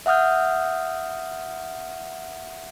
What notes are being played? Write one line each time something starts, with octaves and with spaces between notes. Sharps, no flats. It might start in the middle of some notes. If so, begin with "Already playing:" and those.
E5 F#5 D#6 F6 G6